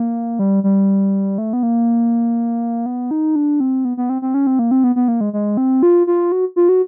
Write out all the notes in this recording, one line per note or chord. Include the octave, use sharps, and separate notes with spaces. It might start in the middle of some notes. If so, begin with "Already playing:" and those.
Already playing: A#3
G3
G3
A3
B3
A#3
B3
D#4
D4
C4
B3
B3
C4
C4
C#4
C4
A#3
C4
B3
B3
A#3
G#3
G#3
C4
F4
F4
F#4
F4
F#4